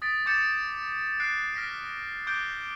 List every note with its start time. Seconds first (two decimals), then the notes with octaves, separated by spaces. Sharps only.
0.02 D#6 A6 B6 D7
0.26 C#6 D6 G6 A6 C#7 E7
1.20 F#6 C7 D7
1.54 F6 A#6 B6 D7
2.27 D6 F#6 G6 D7 G7